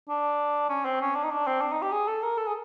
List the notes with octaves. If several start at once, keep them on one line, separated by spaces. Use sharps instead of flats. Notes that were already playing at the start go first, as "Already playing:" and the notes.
D4
C#4
C4
C#4
D4
D#4
D4
C4
D4
D#4
G4
G#4
A4
A#4
A4
G#4